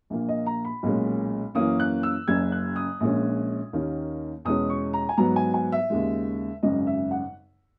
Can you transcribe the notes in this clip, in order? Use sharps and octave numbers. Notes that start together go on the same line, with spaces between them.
A#1 A#2 A#3
D#5
A#5
B5
B1 A#2 G#3 C#4
F#2 E3 A#3 C#4 D#6
F#6
E6
F#1 F#2 C#3 G#6
F#6
D#6
A#1 A#2 G#3 C#4
D#2 D#3 A#3 C#4
E2 B2 G#3 C#4 D#6
C#6
A#5
G#5
G#2 F#3 B3 A#5
G#5
G#5
E5
D#2 C#3 G#3
G#1 F#2 C#3 D#5
E5
F#5